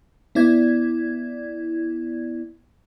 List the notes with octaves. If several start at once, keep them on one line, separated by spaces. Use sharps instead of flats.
B3 E4 D5 G#6